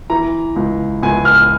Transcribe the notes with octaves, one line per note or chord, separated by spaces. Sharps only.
E3 A#5
C#2
C#2 G#5
F6